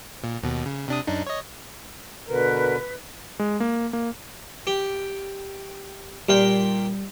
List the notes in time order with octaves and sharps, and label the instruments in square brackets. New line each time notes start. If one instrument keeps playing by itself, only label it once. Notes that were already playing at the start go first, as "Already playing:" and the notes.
[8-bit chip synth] A#2
D#2 B2
C#3
C3 D4 D#6
F#2 D4 D#4
C#5 D#5
[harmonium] B2 D3 A#4 [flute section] B4
[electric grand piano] G#3
A#3
A#3
[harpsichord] G4
[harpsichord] A#2 F5 G5 [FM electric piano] G3